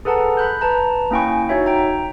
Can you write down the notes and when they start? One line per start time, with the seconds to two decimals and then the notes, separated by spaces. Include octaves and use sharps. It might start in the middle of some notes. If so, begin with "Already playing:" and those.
0.05 G#4 A4 B4 F#5 A5 A#5
0.37 B5 F#6 G6
0.61 B4 A5 A#5
1.11 A#3 C#4 E4 G5 G#5 C#6
1.49 D#4 F#4 C#5 E5
1.66 G5 A#5